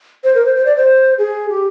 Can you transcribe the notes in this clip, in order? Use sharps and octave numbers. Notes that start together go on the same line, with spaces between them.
C5
A#4
C5
C5
D5
C5
G#4
G4